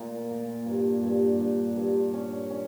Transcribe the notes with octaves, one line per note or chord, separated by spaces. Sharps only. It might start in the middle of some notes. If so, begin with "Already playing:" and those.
Already playing: A#2
A#2
G2
G2
G2
G2
C#4
C#4